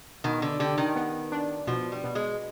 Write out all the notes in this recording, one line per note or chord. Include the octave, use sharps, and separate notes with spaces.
B2 D#3
D3
D3 G4
D#3
B3
D4
B2 F3
G3
B2
G#3